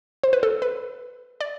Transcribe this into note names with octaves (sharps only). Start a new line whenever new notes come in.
C5
B4
A4
B4
D5